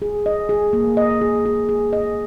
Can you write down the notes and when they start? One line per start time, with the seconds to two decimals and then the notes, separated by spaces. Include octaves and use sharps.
0.02 G#4
0.26 D#5
0.49 G#4
0.73 A#3
0.97 D#5
1.21 G#4
1.46 G#4
1.69 G#4
1.93 D#5